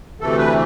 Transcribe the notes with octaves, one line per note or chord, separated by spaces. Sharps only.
D2 C3 E3 A3 A4
B4